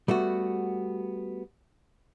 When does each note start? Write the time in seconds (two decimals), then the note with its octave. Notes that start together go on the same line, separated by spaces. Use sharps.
0.08 G3 A3 B3 F#4